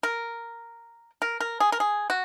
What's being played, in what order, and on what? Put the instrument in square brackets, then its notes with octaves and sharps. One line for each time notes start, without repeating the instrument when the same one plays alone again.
[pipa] A#4
A#4
A#4
G#4
A#4
G#4
F#4